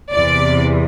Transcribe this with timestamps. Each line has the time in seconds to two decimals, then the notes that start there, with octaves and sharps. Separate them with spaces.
0.12 E2 C3 E3 D5